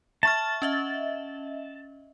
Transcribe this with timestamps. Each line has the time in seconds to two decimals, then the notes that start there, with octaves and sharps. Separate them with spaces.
0.23 E5 A5 C#6 F6
0.62 C#4 D#5 E5